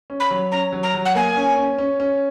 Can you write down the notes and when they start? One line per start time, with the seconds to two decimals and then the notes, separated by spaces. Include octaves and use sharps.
0.10 C#4
0.20 B5
0.31 F#3
0.51 C#4 A#5
0.73 F#3
0.83 A#5
0.94 F#3
1.05 F#5
1.15 A#3 G#5
1.36 C#4
1.57 C#4
1.78 C#4
2.00 C#4